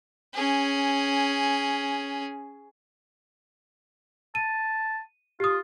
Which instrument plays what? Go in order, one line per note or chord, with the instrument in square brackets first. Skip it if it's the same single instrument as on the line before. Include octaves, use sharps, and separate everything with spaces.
[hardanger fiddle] C#4 G#4
[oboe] A5 [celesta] D#7
[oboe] F4 [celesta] G4 D#6